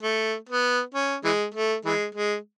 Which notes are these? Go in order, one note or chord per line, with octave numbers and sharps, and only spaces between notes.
A3
B3
C#4
E3 G#3
A3
E3 G#3
G#3